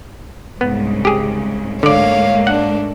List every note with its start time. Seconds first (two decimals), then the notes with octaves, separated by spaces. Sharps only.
0.61 C2 G#2 C#3 B3
1.05 G4 G#4
1.83 G#2 D3 A3 A#3 C#5 D5 F5
2.47 D4 F#5